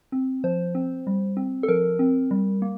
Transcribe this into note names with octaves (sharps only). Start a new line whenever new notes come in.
C4
F3 C5
C4
G3
C4
A4
F3 A#4
C4
G3
A#3